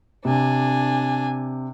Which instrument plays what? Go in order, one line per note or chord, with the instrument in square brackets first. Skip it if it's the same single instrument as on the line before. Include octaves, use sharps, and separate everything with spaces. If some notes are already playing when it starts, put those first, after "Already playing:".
[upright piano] C3 [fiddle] D4 G#5